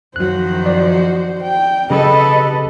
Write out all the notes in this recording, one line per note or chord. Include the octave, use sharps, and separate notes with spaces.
F#2 D#3 F3 F#3 F#4 C5 F#6
D5
G5
C#3 F#3 G4 A4 B4 D#5 B5